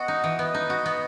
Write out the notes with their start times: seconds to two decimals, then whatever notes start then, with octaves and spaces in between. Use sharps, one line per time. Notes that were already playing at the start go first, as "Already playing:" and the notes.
Already playing: B3 F#4 D#5 F#5
0.08 D#4
0.24 E3
0.38 B3 B4 D#5
0.54 D#4
0.70 F#4
0.86 B3